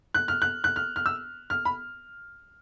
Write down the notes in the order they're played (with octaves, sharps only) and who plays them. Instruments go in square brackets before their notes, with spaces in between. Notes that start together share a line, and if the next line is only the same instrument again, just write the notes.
[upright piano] F#6
F6
F#6
F#6
F6
F6
E6
F6
B5